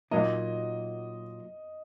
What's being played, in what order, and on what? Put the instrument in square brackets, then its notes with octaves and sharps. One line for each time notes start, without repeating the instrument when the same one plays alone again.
[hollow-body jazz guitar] A#2 F#3 A#3 D#4 [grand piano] D#5